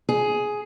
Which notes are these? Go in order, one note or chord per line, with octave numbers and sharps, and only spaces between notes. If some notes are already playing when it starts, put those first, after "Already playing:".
G#4